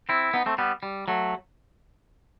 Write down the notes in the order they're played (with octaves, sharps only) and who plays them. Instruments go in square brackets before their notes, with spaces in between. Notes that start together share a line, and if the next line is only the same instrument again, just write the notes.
[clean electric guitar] C4 E4
B3 D#4
A3 C4
G3 B3
G3
F#3 A3